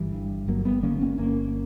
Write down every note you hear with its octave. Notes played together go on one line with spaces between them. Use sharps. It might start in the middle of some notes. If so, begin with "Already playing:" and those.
Already playing: G1 E3 G3
G2
G1 F#3 A#3
G3 B3
D3 A#3 C#4
A#3 C#4
G1 A#3 C#4